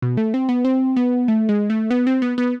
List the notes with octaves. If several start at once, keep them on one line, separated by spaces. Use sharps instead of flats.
B2
A3
C4
B3
C4
B3
A3
G#3
A3
B3
C4
B3
B3